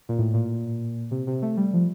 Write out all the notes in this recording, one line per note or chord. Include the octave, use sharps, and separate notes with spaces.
A#2
A2
A#2
C3
C3
A3
G3
F3